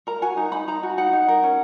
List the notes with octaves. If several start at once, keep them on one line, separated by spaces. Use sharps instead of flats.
A#4 A#5
F#4 G#5
D#4 A#5
D#4 B5
D#4 A#5
F#4
D#4 F#5
D#4
A#4
C#4